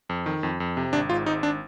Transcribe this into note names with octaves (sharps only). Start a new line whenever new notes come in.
F2
D#3
F2
F2
C3
G#1 D4
G#2 F4
G#1 D#4
D4